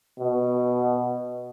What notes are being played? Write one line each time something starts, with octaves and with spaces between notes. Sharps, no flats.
B2